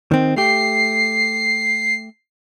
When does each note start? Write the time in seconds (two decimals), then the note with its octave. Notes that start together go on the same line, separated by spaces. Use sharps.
0.11 D#3 C4
0.36 A3 G4 C7